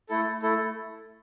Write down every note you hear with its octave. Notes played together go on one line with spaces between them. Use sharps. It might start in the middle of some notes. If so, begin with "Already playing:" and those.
A3 E4 A4
A3 E4 A4